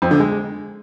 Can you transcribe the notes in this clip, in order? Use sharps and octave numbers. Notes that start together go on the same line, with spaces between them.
F2
D3
G#3